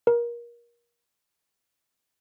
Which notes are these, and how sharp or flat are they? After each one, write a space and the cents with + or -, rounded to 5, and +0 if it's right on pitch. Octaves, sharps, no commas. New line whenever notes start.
A#4 +25